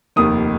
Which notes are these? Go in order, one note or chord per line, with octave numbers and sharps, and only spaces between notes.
F1 D#2 D#3 D#6